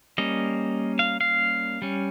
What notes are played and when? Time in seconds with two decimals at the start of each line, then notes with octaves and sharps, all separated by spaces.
0.18 G3 A#3 C#4 D#5
0.99 F5
1.21 F5
1.82 G3 C#4